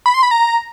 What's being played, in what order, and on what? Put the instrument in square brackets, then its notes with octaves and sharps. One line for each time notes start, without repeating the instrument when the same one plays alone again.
[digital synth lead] B5
C6
B5
A#5